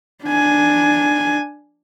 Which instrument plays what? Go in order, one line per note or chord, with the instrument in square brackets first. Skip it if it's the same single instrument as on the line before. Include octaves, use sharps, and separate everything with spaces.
[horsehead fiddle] D4 G#5